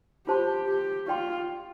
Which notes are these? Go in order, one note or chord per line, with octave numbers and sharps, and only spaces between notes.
F4 G4 C5 A5 C6
G4
F4 G4 D5 G5 C6